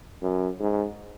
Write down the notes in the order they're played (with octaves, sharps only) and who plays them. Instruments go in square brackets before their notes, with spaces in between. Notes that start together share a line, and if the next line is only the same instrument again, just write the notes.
[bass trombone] F#2
G#2